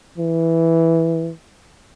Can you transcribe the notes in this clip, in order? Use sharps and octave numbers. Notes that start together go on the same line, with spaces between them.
E3